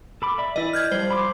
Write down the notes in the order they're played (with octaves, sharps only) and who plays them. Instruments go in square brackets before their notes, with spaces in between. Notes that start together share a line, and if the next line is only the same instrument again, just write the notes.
[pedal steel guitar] A4 B5 D6
D5 E5 B5
[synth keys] E3 [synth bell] E4 D#5 [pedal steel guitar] D5
[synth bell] F6 G6 G#6
[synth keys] F3 G3 [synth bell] C5
[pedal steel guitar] B5 C6 D6